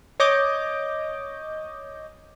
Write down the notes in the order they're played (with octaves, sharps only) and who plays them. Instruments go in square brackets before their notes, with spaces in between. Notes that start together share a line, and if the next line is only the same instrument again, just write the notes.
[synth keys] C#5 D#5 D6 G6